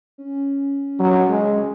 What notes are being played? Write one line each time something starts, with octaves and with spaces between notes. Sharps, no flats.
C#4
F#3
G#3